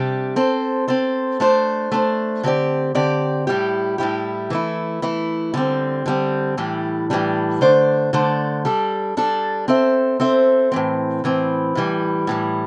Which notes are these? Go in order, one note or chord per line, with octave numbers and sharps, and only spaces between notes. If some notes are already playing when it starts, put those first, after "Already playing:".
Already playing: C3 G3 D4 G4
C4 A4 C5
C4 A4 C5
A3 D4 C5
A3 D4 C5
D3 C4 G4 D5
D3 C4 G4 D5
A2 G3 E4 G4
A2 G3 E4 G4
E3 A3 E4
E3 A3 E4
D3 G3 C4
D3 G3 C4
A2 E3 G3 D4
A2 E3 G3 D4
D3 A3 D4 C5
D3 A3 D4 C5
G3 D4 A4
G3 D4 A4
C4 A4 C5 E5
C4 A4 C5 E5
A2 E3 C4
A2 E3 C4
A2 E3 G3
A2 E3 G3